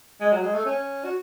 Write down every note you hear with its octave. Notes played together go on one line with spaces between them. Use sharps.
G#3
F#3
G#3
A3
C#4
F#4